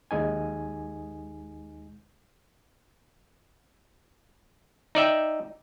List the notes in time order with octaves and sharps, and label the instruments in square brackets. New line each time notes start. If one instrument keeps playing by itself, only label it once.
[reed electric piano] D#2 G#3 D#4 G#5
[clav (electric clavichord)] D#4 D5 E5 G5